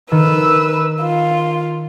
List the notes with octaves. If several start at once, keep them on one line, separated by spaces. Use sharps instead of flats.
D#3 B4 E6
F4